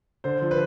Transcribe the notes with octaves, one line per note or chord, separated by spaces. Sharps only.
D3 C5
F3
B4